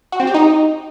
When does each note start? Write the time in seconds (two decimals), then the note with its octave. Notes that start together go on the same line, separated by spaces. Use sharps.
0.12 F#4
0.20 C4
0.27 G4
0.34 D#4